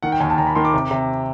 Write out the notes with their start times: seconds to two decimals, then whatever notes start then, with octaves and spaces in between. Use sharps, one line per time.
0.03 D#3 F#5
0.12 G5
0.20 D#2 G#5
0.30 A5
0.38 D#2 A#5
0.47 B5
0.55 D#3 C6
0.65 D6
0.74 C3
0.91 C3